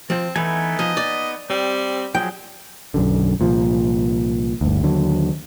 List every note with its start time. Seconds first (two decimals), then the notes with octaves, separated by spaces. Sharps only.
0.10 F3 C4
0.36 E3 A3 B3 D#4 G#5
0.79 F3 D#5
0.97 D5
1.50 G3 C4
2.15 F3 F#3 G#4 G5
2.94 B1 F#2 D3
3.40 C2 A#2 F3
4.61 G1 D2
4.83 D#2 D3 F#3